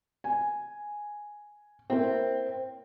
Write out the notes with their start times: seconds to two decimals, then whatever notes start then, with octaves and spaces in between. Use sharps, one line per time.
0.24 G#5
1.90 A#3 C4 E4